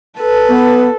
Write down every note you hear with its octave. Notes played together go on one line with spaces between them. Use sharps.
A4 B4
B3